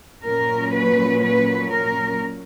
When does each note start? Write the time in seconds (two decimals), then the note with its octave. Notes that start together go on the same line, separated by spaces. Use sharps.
0.24 A#2 F#3 A#3 C#4 A#4
0.73 B4
1.22 B4
1.70 A#4